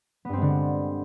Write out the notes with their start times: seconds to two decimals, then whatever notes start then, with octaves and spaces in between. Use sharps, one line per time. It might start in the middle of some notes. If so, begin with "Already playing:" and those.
0.25 B3
0.29 G2
0.33 C4
0.37 G#3
0.42 D3